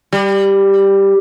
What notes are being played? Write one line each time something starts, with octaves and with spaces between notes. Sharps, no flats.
G3